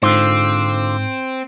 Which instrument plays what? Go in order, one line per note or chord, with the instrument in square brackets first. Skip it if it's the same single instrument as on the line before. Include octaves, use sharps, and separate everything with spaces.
[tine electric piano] G#2 [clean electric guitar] D3 F4 C5 [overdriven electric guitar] C4